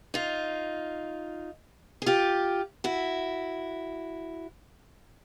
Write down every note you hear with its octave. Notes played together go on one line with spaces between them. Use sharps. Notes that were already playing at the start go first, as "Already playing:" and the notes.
D#4 F4
G#4
F4 G4
E4 F#4